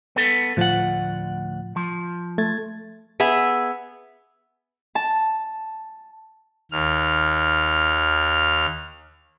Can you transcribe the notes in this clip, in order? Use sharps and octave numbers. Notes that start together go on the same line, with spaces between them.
B3 A4
D2 A2 F3 F#5 A6
F3
A3 G#6 A6
B3 G#4 E5
A5
D#2 F6